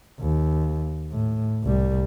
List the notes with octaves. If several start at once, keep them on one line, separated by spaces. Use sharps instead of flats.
D#2
A2
C2 G3